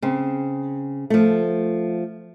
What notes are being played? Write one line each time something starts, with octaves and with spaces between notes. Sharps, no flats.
C#3 C4
F3 A3